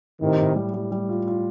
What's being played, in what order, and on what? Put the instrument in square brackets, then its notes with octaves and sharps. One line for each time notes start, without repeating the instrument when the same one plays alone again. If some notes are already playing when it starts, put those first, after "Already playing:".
[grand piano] A2 [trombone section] C3 D#3
[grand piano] A2
G3
G3
G3
F4
F4